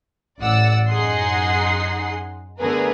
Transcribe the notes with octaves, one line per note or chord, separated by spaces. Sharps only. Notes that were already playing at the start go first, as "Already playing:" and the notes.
A1 D5 F#5 E6
F#2 D#4 G#4 F#5 C6 C7
D3 A3 B3 G#4 A#4 B4